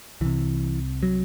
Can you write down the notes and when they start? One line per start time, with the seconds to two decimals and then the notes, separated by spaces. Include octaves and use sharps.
0.21 C2 C3 E3
1.03 F#3